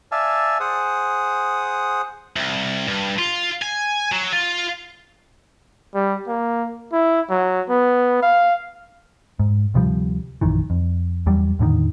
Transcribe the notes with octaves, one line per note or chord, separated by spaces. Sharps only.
D5 E5 F5 G#5 A5
G#4 C5 F#5 D#6
C2
G2
F4
G#5
F#3
F4
G3
A#3
E4
F#3
B3
F5
G#2
D2 C3 F3 G3
A#1 F#2 D#3 E3
F2
E2 F#3 G3
E2 A2 D3 D#3